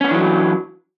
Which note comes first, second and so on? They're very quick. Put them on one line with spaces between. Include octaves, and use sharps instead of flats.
C#4 B3 D4 E3 F#3